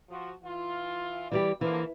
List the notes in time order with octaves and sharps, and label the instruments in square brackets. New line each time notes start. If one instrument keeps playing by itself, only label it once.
[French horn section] F3 F#4
E3 F4
[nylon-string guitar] E3 G3 G4 [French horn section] D5
[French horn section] D3 F3 A#3 [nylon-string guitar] E3